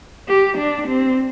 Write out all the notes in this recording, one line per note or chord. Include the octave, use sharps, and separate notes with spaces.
G4
D4
C4